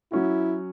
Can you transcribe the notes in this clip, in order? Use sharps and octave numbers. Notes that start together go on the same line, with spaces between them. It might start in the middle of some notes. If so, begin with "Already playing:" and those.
F#3 C#4 E4 F#4